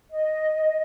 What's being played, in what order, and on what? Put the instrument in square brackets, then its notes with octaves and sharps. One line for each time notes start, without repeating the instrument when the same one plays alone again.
[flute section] D#5